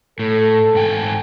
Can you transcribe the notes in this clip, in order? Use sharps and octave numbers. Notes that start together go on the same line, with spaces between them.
A2 A4
G#2 G5 G#5